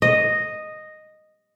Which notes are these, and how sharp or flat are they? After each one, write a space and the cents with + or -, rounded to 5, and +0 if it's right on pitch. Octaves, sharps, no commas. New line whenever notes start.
D#5 -5